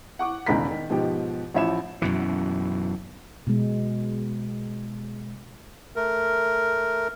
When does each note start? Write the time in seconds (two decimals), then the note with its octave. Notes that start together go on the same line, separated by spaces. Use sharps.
0.19 F#5 C#6 D6
0.46 E1 C#2 D#3 A#5 B5 B6
0.71 D#3
0.90 G#2 B2 F3 G4
1.54 A1 F3 C#5 E5 B5 E7
2.02 F#2 B2 E3
3.47 B2 G#3
5.96 A3 A#4